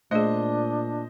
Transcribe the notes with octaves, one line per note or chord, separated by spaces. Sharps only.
A#2 A3 D4 G#4 C5 D#5